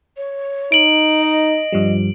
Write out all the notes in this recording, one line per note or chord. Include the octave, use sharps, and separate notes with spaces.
C#5
D#4 D7 F#7
D#5
G2 F3 G3